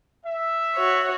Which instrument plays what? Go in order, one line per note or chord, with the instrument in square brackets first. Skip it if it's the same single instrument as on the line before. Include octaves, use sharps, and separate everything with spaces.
[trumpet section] E5
[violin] F#4 C#5